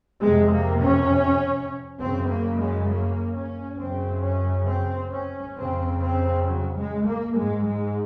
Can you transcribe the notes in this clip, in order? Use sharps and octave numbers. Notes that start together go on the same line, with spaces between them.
F2 C3 G#3
A#3
C#4
F#2 C#3 C4
A#3
G#3
A#3
C#4
F#2 C#3 C4
C#4
C4
C#4
F2 C#3 C4
C4
F#3
G#3
A#3
G#2 G#3
G#3